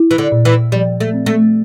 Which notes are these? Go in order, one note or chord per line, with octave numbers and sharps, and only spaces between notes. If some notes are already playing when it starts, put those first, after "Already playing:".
Already playing: E4
E3
D3
A#2
E3
F3 G3
A3
C4
A3